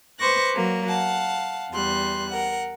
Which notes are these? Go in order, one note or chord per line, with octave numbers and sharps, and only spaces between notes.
B4 C5 C#6 D6 F#6 A#6
F#3 A#3 C#6
F5 F#5 A5
E2 G3 C6 F#6
A#4 F#5